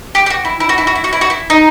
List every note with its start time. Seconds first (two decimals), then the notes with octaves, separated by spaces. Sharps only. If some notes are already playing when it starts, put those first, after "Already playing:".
0.15 G4
0.26 G4
0.30 F#4
0.45 E4
0.60 E4
0.69 F#4
0.78 E4
0.87 F#4
0.95 E4
1.04 F#4
1.13 E4
1.21 F#4
1.30 E4
1.50 D#4